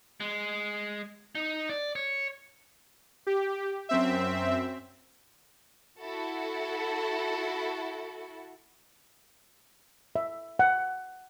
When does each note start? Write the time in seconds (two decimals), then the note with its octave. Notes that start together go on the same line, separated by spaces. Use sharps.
0.20 G#3
1.35 D#4
1.69 D5
1.95 C#5
3.27 G4
3.89 F#2 C4 E5
5.99 E4 F#4 A4
10.16 E5
10.59 F#5